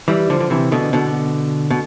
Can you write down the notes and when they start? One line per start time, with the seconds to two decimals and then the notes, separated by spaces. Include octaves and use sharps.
0.08 E3 G3
0.30 D3 F3
0.40 D3
0.50 C3 E3
0.72 B2 D3
0.93 B2 D3
1.70 B2